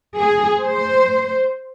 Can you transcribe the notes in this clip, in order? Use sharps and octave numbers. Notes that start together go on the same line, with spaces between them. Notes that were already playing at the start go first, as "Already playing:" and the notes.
G#4
C5